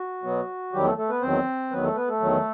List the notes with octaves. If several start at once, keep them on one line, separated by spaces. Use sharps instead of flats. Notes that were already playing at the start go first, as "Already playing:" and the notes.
Already playing: F#4
B2 F#3 B3
E2 D#3 F#3 G3 G4
A3 A4
A3 A4
B3 B4
E2 D#3 F#3 C4 C5
E2 D#3 F#3 B3 B4
A3 A4
B3 B4
A3 A4
E2 D#3 F#3